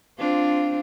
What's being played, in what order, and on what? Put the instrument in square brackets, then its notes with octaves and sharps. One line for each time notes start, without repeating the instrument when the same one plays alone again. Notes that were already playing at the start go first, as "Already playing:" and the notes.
[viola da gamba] C4 D4 F4